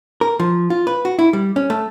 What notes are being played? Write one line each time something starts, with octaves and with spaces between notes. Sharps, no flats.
A#4
F3
F4
B4
F#4
E4
G3
C#4
A3